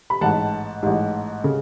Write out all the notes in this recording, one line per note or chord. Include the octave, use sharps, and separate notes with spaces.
B5
A1 G#2 F#5 A5
A1 G#2
C#3